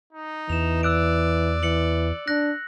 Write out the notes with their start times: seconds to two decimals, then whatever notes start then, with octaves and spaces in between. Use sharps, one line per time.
0.13 D#4
0.49 E2 E3 E7 F7
0.83 D5 E6 F#6 D7
1.63 E3 C#7 F#7
2.28 D4 F#6 A#6